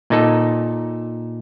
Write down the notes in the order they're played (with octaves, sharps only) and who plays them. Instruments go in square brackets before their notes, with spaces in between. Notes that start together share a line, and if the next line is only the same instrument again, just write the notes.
[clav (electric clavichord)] A#2 D#4 A4